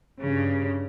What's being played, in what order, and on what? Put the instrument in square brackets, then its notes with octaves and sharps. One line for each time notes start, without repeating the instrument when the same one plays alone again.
[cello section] G2 C#3